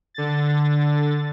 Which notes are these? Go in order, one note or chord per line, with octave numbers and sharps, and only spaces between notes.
D3 A6